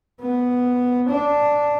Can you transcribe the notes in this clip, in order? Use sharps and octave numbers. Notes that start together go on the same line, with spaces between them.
B3
D4